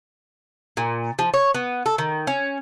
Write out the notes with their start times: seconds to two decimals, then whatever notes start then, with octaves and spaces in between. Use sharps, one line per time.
0.77 A#2
1.19 F3
1.34 C#5
1.54 B3
1.86 A4
1.98 D#3
2.27 C#4